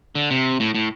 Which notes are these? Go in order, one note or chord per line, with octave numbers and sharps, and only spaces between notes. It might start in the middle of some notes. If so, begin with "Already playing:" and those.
D3
C3
A2
A2